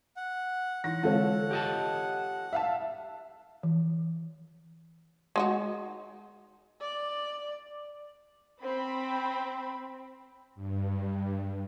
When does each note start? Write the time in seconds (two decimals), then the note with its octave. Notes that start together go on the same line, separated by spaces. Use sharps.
0.17 F#5
0.84 E3 D#4 E4 F#5 A#6
1.03 D3 G#3 C4 F4 A4 C#5
1.51 G4 D#5 A5
2.53 E5 F5 A5
3.63 E3
5.36 G#3 D#4 F#4
6.81 D5
8.64 C4 B5
10.55 G2